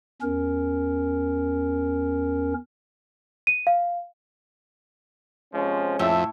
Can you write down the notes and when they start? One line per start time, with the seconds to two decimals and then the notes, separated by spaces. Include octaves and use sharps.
0.22 E2 C#4 A#4
3.47 D#7
3.67 F5
5.53 C3 F3 G#3 C#4
5.99 F2 A2 E5